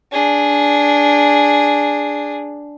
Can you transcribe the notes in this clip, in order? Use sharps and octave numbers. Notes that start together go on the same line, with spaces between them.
D4 G#4